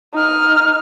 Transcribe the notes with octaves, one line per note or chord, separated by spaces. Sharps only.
D#4 F6